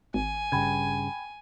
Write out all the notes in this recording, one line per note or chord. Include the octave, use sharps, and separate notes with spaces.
G#1 G#5
G2 C#3 G5 B5 G#6